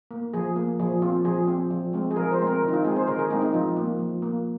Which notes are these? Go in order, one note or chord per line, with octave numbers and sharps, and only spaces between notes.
A#3
F3 G#4
A#3
F3 G#4
C4 F4
F3 G#4
C4
F3
G#3 C4
G#4
F3 A#4
C5
G#3 C4
A#4
D#3
D#4
F4
G#3 C4 G#4
C5
D#3 A#4
G#4
G#3 C4 D#4
D#4
F3 F4
A#3
F3
A#3